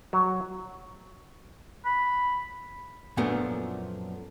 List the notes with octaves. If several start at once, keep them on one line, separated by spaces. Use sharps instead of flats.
F#3
B5
F#2 A#2 F3 A3 B3 D4